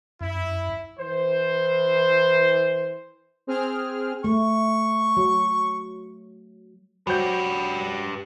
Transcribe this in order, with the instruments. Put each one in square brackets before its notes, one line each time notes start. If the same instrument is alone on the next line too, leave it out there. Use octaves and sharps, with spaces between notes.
[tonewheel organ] F#2 [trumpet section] E4
[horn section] E3 C5
[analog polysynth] C4 G#4 F6
[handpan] A3 [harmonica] C#6
[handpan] F#3
[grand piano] F#3 C5 G6 [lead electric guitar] G4 B4